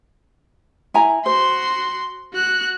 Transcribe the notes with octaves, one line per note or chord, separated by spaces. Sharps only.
E4 G#5 A#5
F#4 C5 C6
F#4 F#6